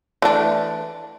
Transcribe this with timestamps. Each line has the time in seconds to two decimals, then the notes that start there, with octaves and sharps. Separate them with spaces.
0.22 E3 A3 D4